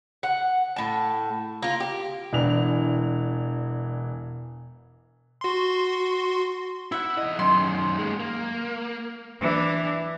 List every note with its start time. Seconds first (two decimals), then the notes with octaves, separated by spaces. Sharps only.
0.23 F#5
0.76 A2 A5
1.62 A#3 F4
1.80 G4
2.33 E1 E3 D4 F7
5.41 F#4 C6
6.92 E4 E5 F#5
7.18 E2 D#5
7.39 F#2 D#3 C6
7.98 G#3 A#3
8.20 A#3
9.41 E3 D4